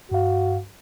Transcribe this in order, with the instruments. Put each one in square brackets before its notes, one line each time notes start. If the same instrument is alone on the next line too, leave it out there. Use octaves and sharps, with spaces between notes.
[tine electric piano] G2 F5 [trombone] F#4